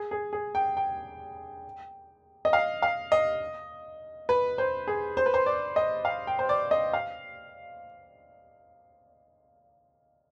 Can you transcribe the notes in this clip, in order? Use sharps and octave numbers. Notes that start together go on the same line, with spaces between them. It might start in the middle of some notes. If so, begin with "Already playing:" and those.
Already playing: G#4
G#4
G#4
G5
G5
D#5
F5
F5
D#5
B4
C5
G#4
C5
B4
C5
D5
D#5
F5
G5
C5
D5
D#5
F5